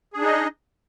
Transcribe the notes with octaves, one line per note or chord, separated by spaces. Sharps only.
D4 D#4 G#4 D#5